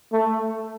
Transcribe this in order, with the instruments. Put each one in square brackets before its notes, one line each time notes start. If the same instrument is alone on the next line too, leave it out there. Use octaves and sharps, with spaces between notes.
[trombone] A3